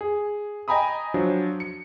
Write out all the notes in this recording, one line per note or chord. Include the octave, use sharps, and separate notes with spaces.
G#4
D#5 G5 G#5 A#5 B5 D#6
F3 F#3 D4
C#7